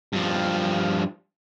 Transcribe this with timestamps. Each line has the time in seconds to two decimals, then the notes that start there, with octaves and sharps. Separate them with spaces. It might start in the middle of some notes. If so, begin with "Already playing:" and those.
0.13 G2 F3